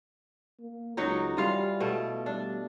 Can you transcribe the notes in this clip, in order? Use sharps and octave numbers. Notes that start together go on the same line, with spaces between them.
A#3
C#2 F#3 D#4 F#4
E3 G3 F4 F5
B2 A3
G3 D4